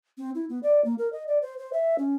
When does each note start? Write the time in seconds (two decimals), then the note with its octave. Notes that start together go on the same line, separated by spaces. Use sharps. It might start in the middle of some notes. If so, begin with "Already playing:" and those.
0.18 C4
0.35 E4
0.49 B3
0.63 D5
0.85 A#3
0.98 A#4
1.13 D#5
1.28 D5
1.42 C5
1.58 C5
1.73 E5
1.98 C#4